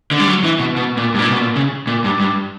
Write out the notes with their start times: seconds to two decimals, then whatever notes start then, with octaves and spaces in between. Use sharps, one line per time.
0.11 D3
0.20 G3
0.28 F#3
0.44 E3
0.59 B2
0.76 B2
0.97 A#2
1.14 G2
1.19 A#2
1.31 B2
1.40 A#2
1.56 C#3
1.87 A#2
2.04 G2
2.20 G2